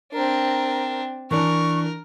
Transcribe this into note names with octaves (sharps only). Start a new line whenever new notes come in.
C4 D4 A#4
E3 D4 A#4 C#6